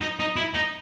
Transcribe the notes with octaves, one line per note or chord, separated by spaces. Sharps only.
D#4
D#4
E4
D#4